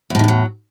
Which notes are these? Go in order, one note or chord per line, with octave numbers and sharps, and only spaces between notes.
E2 A2 D3 D#3 F#3